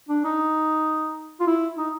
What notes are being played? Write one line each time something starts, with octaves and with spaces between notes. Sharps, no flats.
D4
D#4
F4
E4
D#4